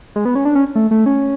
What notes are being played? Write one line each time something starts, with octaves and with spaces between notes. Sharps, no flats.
G#3
B3
C#4
D4
C#4
A3
A3
C#4